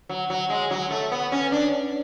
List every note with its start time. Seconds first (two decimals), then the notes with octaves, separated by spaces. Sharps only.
0.09 F#3
0.30 F#3
0.50 G#3
0.71 F#3
0.90 A3
1.12 B3
1.32 C#4
1.52 D4